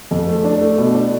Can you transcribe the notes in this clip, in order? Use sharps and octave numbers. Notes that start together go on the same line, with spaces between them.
F2
A3
D4
A3
B2
D4